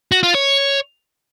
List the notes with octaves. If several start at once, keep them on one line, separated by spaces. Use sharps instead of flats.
F#4
F4
C#5